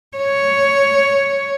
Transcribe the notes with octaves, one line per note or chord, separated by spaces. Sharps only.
C#5